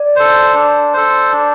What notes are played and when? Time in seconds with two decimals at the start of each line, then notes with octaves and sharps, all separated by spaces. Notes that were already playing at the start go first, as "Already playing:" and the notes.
Already playing: D5
0.16 A4 C5
0.54 D4
0.93 A4 C5
1.32 D4